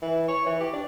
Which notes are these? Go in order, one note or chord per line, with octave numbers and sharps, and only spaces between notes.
E3
C#5
E3
G4
D4